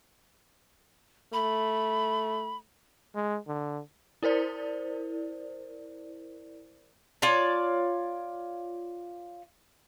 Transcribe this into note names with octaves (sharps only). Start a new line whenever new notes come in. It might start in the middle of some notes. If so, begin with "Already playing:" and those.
A3 B5
G#3
D3
E4 A#4 C5 D5
F4 C#5 D5 A5